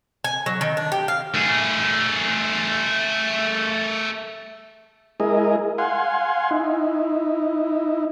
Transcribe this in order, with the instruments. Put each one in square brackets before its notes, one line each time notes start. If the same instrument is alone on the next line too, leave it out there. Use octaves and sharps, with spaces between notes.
[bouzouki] G#5
F#3
D#3
D4
G4
F5
[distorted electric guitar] A3 G#4
[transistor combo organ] G#3 E4 G#4 A#4 D#5
F5 F#5 G#5 C6
D#4 E4